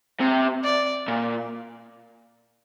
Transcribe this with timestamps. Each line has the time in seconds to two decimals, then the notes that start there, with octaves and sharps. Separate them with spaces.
0.20 C3
0.64 D5
1.08 A#2